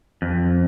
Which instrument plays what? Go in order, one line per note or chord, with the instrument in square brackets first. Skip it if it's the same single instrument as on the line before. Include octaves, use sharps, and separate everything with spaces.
[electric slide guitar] F2